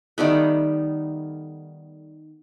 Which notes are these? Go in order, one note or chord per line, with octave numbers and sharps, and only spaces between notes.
D#3 G3 A3 B3